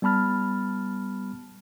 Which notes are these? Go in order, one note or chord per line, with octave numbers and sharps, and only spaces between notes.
G3 B3 A5 B5 F6 A6